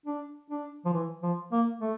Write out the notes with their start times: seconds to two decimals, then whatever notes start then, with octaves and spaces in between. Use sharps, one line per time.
0.06 D4
0.50 D4
0.85 F3
0.94 E3
1.23 F3
1.52 A#3
1.81 A3